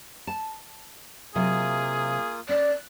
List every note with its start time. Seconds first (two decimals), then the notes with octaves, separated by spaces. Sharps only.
0.27 A5
1.35 C3 F#3 A#3 F4 G#4 D#5 D#6
2.49 C#4 D5 F#6